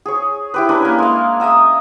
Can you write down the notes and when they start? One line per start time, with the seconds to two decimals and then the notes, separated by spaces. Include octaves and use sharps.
0.05 G#4 C#5
0.54 E4 G4 B4
0.69 C#4 D4 A#4 B4
0.82 A#3 G#5
0.99 G#3 F5
1.40 E5 A#5 D#6 E6